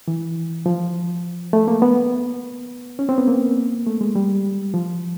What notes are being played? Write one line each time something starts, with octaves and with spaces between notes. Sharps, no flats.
E3
F3
A3
A#3
B3
C#4
C4
B3
A#3
A3
G#3
G3
F3